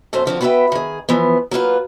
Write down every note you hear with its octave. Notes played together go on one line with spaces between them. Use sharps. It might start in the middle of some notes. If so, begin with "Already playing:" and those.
F#2 B2 A3 A4 C5
D3 F3 C4 F#4
B3 F#4 B4 C5 E5 G5
D#3 G#4
E3 F3 B3
F#3 A#3 F4 B4